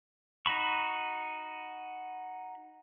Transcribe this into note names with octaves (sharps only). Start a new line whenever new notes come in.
D#4 F#4 B5 C#6